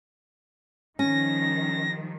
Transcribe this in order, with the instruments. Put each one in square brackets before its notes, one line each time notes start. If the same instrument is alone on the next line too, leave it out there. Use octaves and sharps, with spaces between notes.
[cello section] D#3 F3 G3 [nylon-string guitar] C#4 [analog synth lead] A#6